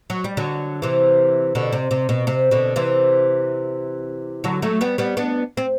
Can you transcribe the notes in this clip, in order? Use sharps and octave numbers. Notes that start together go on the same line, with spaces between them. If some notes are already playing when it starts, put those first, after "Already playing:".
F#3
G3
D3 F#3
C3 E3
B2 D3
C3
C3
B2
C3
B2 D3
C3 E3
D3 F#3
F#3 A3
G3 B3
G3 B3
B3 D4
C4